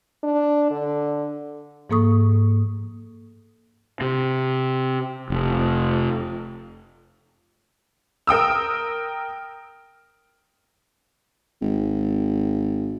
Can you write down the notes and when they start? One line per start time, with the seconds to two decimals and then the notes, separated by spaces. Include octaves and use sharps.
0.23 D4
0.71 D3
1.89 G#2 F3 A#3 A4 C#6 D#6
4.01 C3
5.30 F1
8.27 A#4 G5 D#6 E6
11.62 G#1